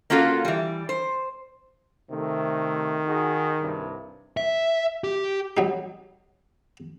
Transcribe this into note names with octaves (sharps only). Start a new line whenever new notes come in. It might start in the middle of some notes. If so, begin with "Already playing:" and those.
A#3 C#4 F4 F#4 A4
E3 G3
C5
C3 D#3 A3
D#4 F#4 G#4
C2 G2 C3
E5
G4
F#3 G3 D#4